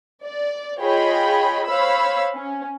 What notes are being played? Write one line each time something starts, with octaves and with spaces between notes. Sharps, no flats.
D5
F4 G#4 C#5 D#5 G5 B5
C5 C#5 F5 B5 E6
C#4